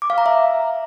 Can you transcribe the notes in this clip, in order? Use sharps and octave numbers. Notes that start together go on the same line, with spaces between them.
D6
F5
A#5
E5